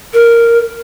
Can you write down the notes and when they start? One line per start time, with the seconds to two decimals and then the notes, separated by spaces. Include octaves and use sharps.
0.14 A#4